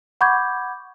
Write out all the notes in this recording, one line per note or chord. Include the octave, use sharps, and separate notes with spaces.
F#5 B5 C#6 D6 G6 G#6